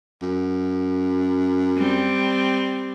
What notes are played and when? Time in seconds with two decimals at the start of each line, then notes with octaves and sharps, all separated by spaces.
0.22 F#2
1.78 G3 C4